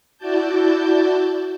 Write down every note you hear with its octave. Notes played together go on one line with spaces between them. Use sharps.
E4 F#4 D5 A5 G6